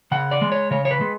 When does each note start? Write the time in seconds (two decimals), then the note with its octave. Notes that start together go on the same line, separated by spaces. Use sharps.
0.11 C#3 F#5
0.31 D5
0.41 G#3
0.52 C#5
0.71 C#3 C#5
0.85 C#5
0.91 B4
1.01 G#3